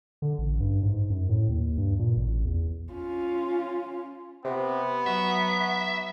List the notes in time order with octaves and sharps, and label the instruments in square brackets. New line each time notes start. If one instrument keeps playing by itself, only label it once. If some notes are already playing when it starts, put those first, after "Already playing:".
[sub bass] D3
A1
G2
G#2
F#2
A2
D#2
G2
A#2
A1
E2
[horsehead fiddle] C#4 F4
[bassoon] C3 [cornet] B3
[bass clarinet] F#3 [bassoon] F#4 [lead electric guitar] E5